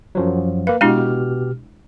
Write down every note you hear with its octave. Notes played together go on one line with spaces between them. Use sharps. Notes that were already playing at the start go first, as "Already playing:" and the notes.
F#2 F3 F#3
A#3 B4 F5
B2 G#3 D4 E4 G4 F6